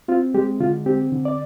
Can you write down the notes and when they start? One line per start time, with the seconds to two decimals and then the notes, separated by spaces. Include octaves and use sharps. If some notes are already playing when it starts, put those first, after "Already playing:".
0.08 C4 F4
0.35 G#3 G4
0.60 D3 F4
0.86 C4 G4
1.12 D3
1.25 D5